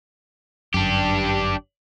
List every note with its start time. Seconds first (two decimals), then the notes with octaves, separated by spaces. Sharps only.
0.74 G1 F#2 D4 G4